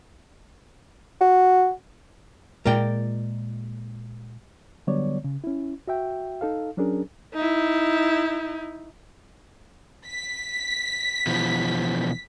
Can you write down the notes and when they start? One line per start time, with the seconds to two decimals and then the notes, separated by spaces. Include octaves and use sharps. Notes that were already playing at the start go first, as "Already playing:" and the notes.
1.21 F#4
2.66 A#2 G#3 A#4 D5 G5
4.87 D3 F#3 G3 B3 C#5 D5
5.24 C#3
5.44 C#4 E4
5.88 F#4 E5 G5
6.41 D#4 A4 F5
6.77 F#3 C#4 D4 G#4 A#4
7.34 D#4 E4
10.07 B6
11.27 B2 E3 F3